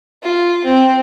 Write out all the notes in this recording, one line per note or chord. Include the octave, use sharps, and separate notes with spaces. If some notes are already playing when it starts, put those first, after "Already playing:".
F4
C4